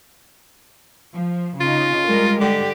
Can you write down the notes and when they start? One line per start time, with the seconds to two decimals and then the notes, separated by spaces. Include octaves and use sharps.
1.14 F3
1.61 C#3 D#4 F4
2.06 G3 G#3 A#4
2.41 D3 G4